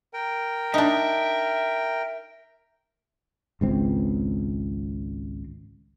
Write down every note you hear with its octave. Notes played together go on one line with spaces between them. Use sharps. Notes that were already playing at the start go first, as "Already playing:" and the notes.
A#4 G5
D4 D#4 E5
G#1 C#2 C4